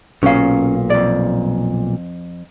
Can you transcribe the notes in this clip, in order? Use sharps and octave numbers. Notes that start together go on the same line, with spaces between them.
B1 A#2 C#4 F5
F2 D5